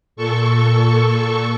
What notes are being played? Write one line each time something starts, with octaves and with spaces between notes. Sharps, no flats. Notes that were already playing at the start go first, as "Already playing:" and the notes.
A#2 A4 C#6